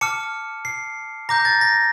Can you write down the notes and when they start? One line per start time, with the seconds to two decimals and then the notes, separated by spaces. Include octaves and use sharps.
0.01 A5 D6 F6 C#7
0.65 C7
1.29 A#5 D6 G6 A#6
1.45 A6
1.61 A#6